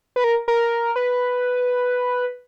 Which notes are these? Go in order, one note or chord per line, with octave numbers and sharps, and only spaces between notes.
B4
A#4
A#4
B4